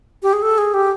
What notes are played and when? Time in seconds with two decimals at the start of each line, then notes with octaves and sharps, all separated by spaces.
0.23 G4
0.33 G#4
0.42 A4
0.58 G#4
0.74 G4